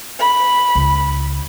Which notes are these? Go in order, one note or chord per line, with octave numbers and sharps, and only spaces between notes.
B5
C#2